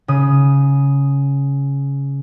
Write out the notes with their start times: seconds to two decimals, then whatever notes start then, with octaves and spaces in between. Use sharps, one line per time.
0.08 C#3 D#6